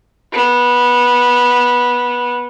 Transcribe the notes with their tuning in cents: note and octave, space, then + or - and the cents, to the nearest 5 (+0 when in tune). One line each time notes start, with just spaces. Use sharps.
B3 -15